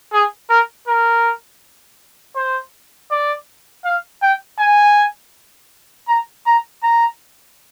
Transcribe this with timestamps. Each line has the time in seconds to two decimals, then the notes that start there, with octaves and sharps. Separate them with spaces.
0.13 G#4
0.49 A#4
0.87 A#4
2.36 C5
3.11 D5
3.85 F5
4.22 G5
4.59 G#5
6.08 A#5
6.46 A#5
6.83 A#5